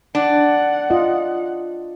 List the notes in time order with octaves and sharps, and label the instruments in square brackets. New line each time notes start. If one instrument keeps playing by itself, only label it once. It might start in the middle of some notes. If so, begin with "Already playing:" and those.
[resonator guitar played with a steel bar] D4 [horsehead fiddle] F#5
[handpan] F4 D#5